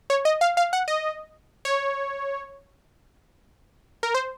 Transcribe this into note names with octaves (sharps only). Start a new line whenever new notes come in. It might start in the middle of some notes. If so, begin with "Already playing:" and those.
C#5
D#5
F5
F5
F#5
D#5
C#5
A#4
C5